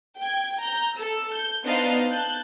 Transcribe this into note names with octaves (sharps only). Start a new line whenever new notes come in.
G5 G#6
A#5 G6
A4 E6
G6
B3 D4 D#4 C5 D#5 F5
A5 F#6 G6